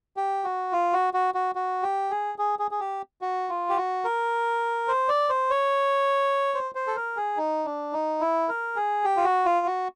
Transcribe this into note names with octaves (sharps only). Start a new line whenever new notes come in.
G4
F#4
F4
F#4
F#4
F#4
F#4
G4
G#4
G#4
G#4
G#4
G4
F#4
F4
G4
F#4
A#4
C5
D5
C5
C#5
C5
C5
A4
A#4
G#4
D#4
D4
D#4
E4
A#4
G#4
G4
F4
F#4
F4
F#4